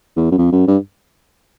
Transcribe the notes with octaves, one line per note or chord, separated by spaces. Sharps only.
E2
F#2
F2
F#2
G2